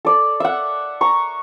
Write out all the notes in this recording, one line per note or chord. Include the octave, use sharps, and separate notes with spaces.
A4 D5
E5 F#5
A#5 C#6